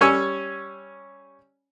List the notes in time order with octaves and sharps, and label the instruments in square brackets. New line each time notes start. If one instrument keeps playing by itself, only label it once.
[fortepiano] G3 C#4 C#5 G#5 C#6 E6